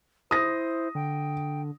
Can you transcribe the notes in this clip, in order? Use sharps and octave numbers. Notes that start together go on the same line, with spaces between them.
E4 C5 D#6 A#6
D3 G5